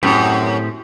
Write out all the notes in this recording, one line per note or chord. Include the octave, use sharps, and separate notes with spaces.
F#2 A2 C4 G4